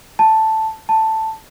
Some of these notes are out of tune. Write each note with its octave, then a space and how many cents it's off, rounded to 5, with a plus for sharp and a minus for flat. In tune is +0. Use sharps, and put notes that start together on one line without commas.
A5 +0
A5 +5